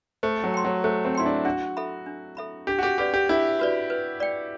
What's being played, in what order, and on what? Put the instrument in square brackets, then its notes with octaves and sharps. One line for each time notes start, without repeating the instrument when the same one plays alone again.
[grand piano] A3 [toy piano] C5
[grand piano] F#3
[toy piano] G5 C6
[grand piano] F#3
[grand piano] A3 [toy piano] C5
[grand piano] C4
[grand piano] E4 [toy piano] G5 C6
[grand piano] D4
[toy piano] D4 [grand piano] F#4
[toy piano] A4 E5 B5
D4
A4 E5 B5
[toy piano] D4 [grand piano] G4
[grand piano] F#4
G4
[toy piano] F#4 B4 D5 [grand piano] G4
[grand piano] G4
[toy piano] D4 [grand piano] E4
[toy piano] F#4 B4 D5
B4
D5 G5